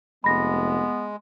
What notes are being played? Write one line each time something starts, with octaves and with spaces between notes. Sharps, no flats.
F1 G#3 B3 B5 A#6